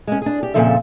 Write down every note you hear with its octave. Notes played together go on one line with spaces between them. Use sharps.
G#3 C#4
D4 G#4
G4
F2 A#2 C#3 F3 A4 E5